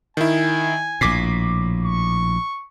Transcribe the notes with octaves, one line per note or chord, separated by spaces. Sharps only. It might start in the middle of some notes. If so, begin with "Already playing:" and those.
D#3 E4 G#5
A#1 A2 D6 B6 C7
C#6